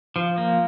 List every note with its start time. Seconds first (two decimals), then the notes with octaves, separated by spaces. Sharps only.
0.16 F3
0.38 A#3